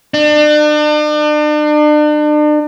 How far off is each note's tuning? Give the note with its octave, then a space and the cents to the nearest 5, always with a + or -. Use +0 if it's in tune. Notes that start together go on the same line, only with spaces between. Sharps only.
D4 +40